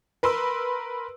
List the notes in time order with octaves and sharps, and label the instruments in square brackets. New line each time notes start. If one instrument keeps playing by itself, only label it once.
[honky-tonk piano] A#4 B4 C6 E6